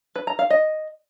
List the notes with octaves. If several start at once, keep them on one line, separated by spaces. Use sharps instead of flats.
B4
A#5
F5
D#5